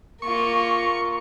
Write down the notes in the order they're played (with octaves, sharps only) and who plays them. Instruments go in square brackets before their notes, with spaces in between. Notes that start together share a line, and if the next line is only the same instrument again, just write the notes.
[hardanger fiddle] A#3 F4 [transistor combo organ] C#6